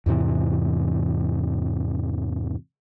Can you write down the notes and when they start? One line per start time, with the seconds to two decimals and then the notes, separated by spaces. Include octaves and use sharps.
0.06 E2 G#2 C3 E3